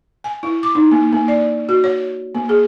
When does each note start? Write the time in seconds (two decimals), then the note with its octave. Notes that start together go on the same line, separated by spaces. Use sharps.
0.24 G#5
0.43 E4
0.63 D6
0.75 D#4
0.91 A#3
1.12 A#3
1.28 D5
1.69 F#4
1.84 C#5
2.35 A#3
2.49 G#4